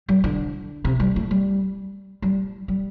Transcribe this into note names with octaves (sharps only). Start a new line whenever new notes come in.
G3
D3
C3
G3
A3
G3
G3
G3